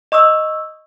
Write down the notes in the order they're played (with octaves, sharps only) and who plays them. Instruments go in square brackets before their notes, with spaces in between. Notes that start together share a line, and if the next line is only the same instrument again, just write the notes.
[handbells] D#5 C#6 D#6 E6